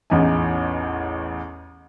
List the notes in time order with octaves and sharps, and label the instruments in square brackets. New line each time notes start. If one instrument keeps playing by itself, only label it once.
[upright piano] A1 E2 D#4 G#5